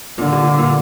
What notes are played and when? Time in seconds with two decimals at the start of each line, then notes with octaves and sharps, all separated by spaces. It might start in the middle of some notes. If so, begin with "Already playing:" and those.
0.18 A#2 D3
0.32 G2
0.45 A#2
0.59 A#2